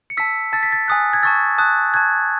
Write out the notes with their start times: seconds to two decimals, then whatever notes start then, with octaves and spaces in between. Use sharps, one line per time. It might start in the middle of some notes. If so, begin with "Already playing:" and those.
0.10 C#7
0.17 A5 E6 B6
0.53 A5 E6 A6
0.63 B6
0.72 A6
0.88 G#5 D#6 F#6
1.13 G#6
1.23 A5 C#6 E6 A6
1.58 A5 D#6 F#6
1.94 A5 C#6 F#6 G#6